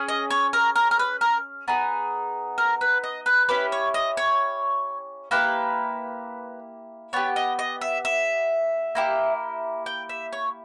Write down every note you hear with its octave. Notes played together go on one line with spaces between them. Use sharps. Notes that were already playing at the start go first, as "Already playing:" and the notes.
Already playing: C#4 G#4
D#5
C#5
A#4
A#4
A#4
B4
A#4
B3 D#4 G#4
A#4
B4
D#5
B4
C#4 E4 G4 B4
C#5
D#5
C#5
A#3 E4 G4 B4
B3 G4 C#5
D#5
D#5
E5
E5
A#3 E4 G4
G5
E5
C#5